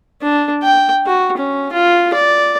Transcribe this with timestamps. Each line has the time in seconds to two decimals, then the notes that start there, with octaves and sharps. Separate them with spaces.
0.22 D4
0.63 G5
1.06 F#4
1.37 C#4
1.72 F4
2.14 D5